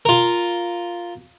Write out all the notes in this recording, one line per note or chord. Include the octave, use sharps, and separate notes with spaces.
F4 A#4